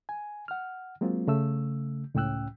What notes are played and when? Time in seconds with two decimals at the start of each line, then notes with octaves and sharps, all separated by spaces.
0.09 G#5
0.48 F#5 F6
1.01 F#3 G#3 A#3 C4 F4
1.28 C#3 A3 E6
2.15 C#2 A2 C#4 G5 E6 F#6